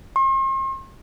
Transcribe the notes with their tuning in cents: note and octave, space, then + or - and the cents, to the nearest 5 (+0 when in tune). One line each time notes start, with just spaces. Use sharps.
C6 +45